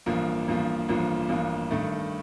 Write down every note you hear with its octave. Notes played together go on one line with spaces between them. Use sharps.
A1 G2 F3 A#3
A1 G2 F3 A#3
A1 G2 F3 A#3
A1 G2 F3 A#3
G2 D#3 A3